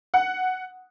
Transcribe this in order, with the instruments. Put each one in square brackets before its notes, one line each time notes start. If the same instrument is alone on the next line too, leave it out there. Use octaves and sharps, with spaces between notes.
[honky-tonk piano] F#5